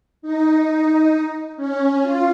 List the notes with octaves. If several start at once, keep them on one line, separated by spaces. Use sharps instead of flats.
D#4
C#4
F4